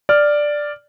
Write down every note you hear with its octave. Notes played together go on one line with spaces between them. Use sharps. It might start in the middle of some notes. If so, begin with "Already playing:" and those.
D5 F6